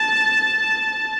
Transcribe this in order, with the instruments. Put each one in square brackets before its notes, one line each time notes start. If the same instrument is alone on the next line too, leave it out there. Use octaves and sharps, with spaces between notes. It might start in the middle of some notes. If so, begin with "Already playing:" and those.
Already playing: [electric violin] A5